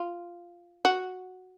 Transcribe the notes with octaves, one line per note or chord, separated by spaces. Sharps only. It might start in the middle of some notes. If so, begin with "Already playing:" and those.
Already playing: F4
F#4